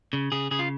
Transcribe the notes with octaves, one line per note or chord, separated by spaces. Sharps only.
C#3
C#3 G#4
C#3 G#4
F4